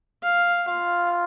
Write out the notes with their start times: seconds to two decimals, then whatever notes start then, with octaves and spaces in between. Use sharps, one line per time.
0.23 F5
0.67 F4 F5